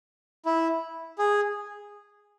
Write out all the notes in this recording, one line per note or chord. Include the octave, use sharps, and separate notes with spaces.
E4
G#4